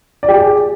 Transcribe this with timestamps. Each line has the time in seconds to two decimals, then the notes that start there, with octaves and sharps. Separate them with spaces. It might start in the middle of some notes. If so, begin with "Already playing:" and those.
0.23 D5
0.28 G4
0.34 G#4